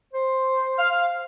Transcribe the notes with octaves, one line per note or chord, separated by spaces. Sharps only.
C5
F5